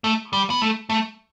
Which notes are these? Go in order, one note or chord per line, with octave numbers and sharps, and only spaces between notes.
A3
G3
B3
A3
A3